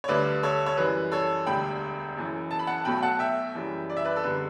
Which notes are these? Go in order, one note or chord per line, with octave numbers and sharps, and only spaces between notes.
C#5
D2 D3 G3 B4 D5
A4 C#5
C#5
F#2 E3 G3 B4
A4 C#5
E1 D2 D3 G3 G5 B5
F#1 F#2 E3
A5
B5
F#5 A5
B1 B2 F#3 A3 G5 B5
F#5 A5
E5 G5
F#1 F#2 E3 G3
D5
E5
B4 D5
A4
F#1 E2 D3 G3 B4